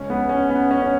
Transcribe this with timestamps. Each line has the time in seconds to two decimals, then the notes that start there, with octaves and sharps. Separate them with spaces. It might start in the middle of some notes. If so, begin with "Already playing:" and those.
Already playing: C#2 C#3 C#4
0.10 B3
0.29 C#4
0.50 B3
0.71 C#4
0.82 C#4